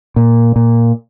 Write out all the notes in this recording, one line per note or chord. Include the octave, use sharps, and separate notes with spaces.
A#2
A#2